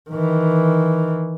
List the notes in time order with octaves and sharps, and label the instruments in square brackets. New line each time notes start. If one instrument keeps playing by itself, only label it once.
[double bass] D#3 E3